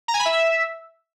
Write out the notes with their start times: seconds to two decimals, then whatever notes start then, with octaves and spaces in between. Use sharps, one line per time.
0.08 A#5
0.14 G#5
0.20 B5
0.25 E5